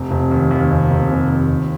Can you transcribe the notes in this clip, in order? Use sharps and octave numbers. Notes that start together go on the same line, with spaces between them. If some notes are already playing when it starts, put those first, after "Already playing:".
Already playing: F1
F1
D#2
D#2
F1
F1
F1
D#2
F1